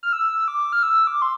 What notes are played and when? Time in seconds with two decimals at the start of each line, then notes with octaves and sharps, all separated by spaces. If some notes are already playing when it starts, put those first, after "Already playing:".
0.03 F6
0.13 E6
0.48 D6
0.72 F6
0.83 E6
1.07 D6
1.22 C6